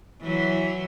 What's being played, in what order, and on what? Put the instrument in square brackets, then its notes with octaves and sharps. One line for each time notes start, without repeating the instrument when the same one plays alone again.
[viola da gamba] E3 F#3